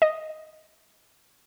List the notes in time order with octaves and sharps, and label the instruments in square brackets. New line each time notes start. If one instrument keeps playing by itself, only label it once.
[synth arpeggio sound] D#5